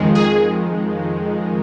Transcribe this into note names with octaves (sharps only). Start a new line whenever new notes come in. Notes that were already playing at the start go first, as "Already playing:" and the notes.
Already playing: F2 D#3 G#3
G#4